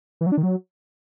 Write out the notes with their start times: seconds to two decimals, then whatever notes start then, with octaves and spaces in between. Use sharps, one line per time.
0.21 E3
0.26 F#3
0.32 D4
0.38 D#3
0.43 F#3